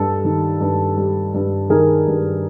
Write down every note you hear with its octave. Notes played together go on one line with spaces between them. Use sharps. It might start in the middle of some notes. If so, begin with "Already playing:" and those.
Already playing: G2 G3 A4
D#3
G2
G3
G2
D#3 G#4 A#4
G2